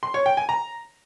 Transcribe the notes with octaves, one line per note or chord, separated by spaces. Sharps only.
C6
C#5
G5
G#5
A#5